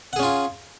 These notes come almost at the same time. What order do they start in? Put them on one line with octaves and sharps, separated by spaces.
F#5 G#4 C#4 F4